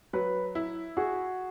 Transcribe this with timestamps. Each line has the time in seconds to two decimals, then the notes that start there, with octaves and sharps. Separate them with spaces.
0.13 F#3 B4
0.55 E4
0.97 F#4 G#4